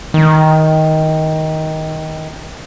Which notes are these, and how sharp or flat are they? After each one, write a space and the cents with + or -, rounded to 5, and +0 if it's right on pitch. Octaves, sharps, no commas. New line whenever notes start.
D#3 +15